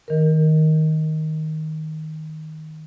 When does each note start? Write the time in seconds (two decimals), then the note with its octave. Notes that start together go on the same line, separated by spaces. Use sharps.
0.08 D#3 A#4